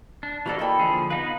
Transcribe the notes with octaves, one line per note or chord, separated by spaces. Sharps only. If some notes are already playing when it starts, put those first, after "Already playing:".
D4
E3 A#3 F#4 A4 A#4 D5
D#5 G5 B5
D3 F3 G#4
B3 D#4 B4 F5